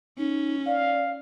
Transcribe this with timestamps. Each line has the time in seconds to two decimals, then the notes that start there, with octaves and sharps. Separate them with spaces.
0.18 C#4 D#4
0.66 D5 F5